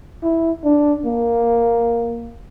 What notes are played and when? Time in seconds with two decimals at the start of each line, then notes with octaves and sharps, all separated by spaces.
0.23 E4
0.64 D4
1.06 A#3